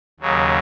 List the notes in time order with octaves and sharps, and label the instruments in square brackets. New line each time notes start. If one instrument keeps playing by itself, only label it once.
[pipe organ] D#2 C#3 F#3